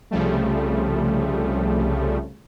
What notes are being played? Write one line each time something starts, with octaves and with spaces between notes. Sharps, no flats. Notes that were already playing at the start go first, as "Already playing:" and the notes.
C2 C#3 F3 G3 A3